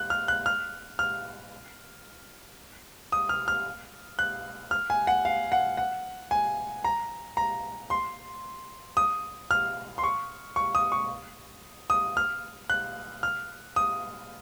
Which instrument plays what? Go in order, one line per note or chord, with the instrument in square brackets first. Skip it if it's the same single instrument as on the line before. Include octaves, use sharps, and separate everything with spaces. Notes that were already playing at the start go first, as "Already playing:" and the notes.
Already playing: [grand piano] F#6
F6
F#6
F6
F6
D#6
F6
F6
F#6
F6
G#5
F#5
F5
F#5
F#5
G#5
A#5
A#5
C6
D#6
F6
C6
C#6
C#6
D#6
C#6
D#6
F6
F#6
F6
D#6